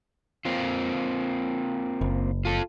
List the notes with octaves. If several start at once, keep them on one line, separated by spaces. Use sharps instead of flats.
A#3 C4 F4
F#1
F4 A4